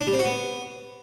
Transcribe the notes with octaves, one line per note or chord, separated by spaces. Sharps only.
D4
G3
C4
F#4
B3